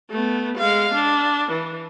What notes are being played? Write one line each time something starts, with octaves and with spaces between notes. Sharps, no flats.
A3 B3
G#3 F5
D4
E3